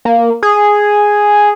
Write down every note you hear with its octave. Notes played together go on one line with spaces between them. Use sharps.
A#3
G#4